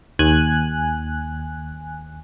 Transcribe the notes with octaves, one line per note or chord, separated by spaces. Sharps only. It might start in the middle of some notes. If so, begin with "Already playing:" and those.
D#2 G#5 F#6